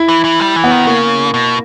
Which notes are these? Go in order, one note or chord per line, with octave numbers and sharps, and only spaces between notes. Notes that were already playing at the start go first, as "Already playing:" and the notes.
Already playing: E4
E3
E3
G3
E3
B3
D#3
C#3 A#3
B2